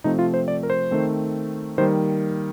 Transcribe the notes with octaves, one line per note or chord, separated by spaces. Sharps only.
C3 F3 A3 C4 D#4
F4
C5
D5
A#4
C5
D#3 A3 C4
D#3 G3 A#3 C5